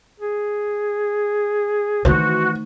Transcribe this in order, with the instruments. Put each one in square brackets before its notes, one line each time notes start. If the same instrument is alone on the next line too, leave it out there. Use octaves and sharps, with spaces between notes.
[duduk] G#4
[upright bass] D#3 A3 [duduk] E3 [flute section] F#4 [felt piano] C5